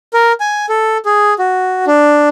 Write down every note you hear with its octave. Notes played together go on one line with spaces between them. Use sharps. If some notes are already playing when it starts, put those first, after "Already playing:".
A#4
G#5
A4
G#4
F#4
D4